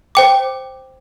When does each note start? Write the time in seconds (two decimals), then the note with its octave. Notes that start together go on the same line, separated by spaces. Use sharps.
0.15 C5 G5 D6